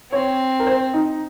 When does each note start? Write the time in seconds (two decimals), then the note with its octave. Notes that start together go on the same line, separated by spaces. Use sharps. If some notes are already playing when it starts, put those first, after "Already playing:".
0.12 C4 C#5
0.60 A#4
0.67 C5
0.94 D#4